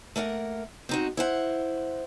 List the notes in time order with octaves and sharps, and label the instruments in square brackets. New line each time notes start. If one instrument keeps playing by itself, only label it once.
[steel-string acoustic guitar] A3 A#3 A#4 F#5
C4 D#4 F#4
E4 C5 F#5